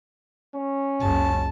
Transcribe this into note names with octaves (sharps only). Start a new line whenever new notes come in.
C#4
F#1 C#2 A5